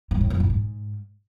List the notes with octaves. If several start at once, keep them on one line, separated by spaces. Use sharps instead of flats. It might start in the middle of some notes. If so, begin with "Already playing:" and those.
G#2
A2
F#2
A#2
G#2